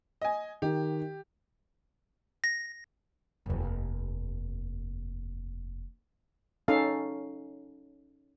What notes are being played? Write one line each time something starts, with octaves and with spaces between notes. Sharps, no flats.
D#5 G#5
D#3 G4
A#6
F1 D#2
C#4 D#4 A4 F5